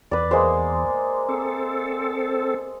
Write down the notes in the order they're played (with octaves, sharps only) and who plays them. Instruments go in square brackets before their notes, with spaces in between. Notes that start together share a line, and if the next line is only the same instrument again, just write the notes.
[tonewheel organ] E2 [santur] B4 D5
[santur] G#3 A#3 C5
[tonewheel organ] C4 A4